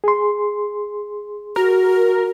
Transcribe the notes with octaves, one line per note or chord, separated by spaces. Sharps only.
G#4 C6
F#4 A#4